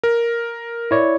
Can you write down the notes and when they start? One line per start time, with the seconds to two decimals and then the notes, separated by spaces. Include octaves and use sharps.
0.04 A#4
0.91 E4 C#5 D5